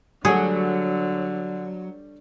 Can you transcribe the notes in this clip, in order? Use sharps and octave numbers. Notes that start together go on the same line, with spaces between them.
D3 F#3 G3 A3 G#4